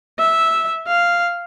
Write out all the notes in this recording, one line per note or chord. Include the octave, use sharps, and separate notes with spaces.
E5
F5